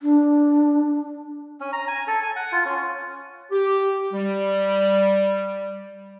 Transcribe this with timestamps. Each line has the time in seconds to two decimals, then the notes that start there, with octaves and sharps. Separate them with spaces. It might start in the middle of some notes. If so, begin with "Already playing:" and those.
0.02 D4
1.60 C#4
1.73 A#5
1.88 G#5
2.07 A4
2.22 G#5
2.36 F#5
2.52 F4
2.65 C#4
3.52 G4
4.13 G3